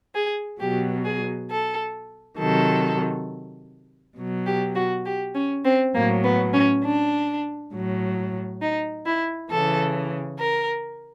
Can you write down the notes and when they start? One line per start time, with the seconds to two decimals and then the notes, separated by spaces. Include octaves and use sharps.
0.15 G#4
0.60 B2 F#3 G4
1.04 G#4
1.50 A4
2.38 C3 D#3 F#3 A4
4.16 B2 F#3
4.46 G4
4.75 F#4
5.05 G4
5.35 C#4
5.65 C4
5.94 A2 F#3 A#3
6.23 B3
6.53 C#4
6.84 D4
7.73 A2 F#3
8.61 D#4
9.06 E4
9.51 C#3 E3 A4
10.39 A#4